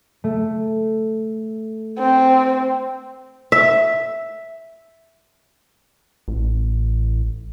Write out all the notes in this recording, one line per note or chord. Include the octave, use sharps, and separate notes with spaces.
A3
C4
E5
A1